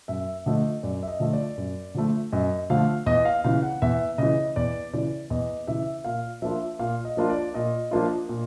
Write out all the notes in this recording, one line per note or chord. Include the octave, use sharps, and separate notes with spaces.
F#2 E5
D3 F3 A3 D#5
F#2 D5
E5
D#5
D3 F3 A3
D5
F#2
D3 F3 A3
F#2 D#5
D3 F3 A3 F5
E2 D#5
F5
C#3 E3 F5
F#5
E2 E5
C#3 E3 D#5
E2 D5
C#3 E3 D5
E2 D#5
C#3 E3 E5
A#2 F5
F3 A#3 D4 F4 E5
A#2 F5
D#5
F3 A#3 D4 F4
D5
A#2 D#5
F3 A#3 D4 F4
A#2